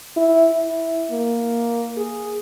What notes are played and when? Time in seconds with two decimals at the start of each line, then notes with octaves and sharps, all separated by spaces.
0.17 E4
0.52 E4
1.11 A#3
1.97 G#4